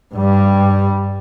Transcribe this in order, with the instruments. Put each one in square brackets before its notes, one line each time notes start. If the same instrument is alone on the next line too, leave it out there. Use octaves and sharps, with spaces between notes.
[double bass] G2 G3